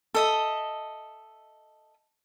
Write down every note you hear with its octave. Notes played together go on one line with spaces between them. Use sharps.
A4 D#5 E5